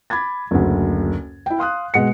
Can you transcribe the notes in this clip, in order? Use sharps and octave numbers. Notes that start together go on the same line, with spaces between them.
B5 D6 G#6 A6
F#1 D2
E4 G5
F5 C6 D#6 F#6
B2 G#3 F#5 C#7